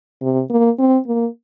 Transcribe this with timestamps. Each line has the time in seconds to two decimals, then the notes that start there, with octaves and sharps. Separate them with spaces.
0.22 C3
0.50 A#3
0.79 C4
1.07 A#3